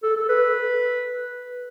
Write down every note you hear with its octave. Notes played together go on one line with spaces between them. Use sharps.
A4
A4
B4